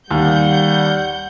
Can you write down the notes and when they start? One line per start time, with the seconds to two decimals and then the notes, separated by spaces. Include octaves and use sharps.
0.11 D#2 G3 F#5 G6